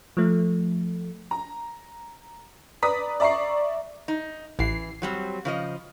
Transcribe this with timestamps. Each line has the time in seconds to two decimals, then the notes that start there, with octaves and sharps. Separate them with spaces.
0.17 F3 A3
1.31 A#5
2.82 B4 D5 A#5 D#6 B6
3.20 D5 E5 A#5 C#6 C7
4.08 D#4
4.59 A1 E3 C7
5.02 F#3 G3 C4
5.45 C#3 F3 D#5